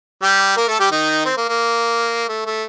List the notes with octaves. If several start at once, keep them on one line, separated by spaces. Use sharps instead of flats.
G3 G4
A#3 A#4
A3 A4
G3 G4
D#3 D#4
C4
A#3
A#3
A3
A3